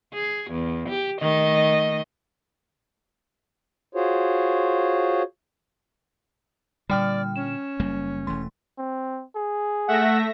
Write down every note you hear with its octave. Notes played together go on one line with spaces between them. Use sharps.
G#4
E2
G4
D#3 A3 D#5
F4 F#4 G#4 C5 C#5
A#2 D3 G3 D5 G5 F6
C#4 E7
F#1 G3 A#3
E1 E3 A3 C6
C4
G#4
A3 E5 F#5 A#6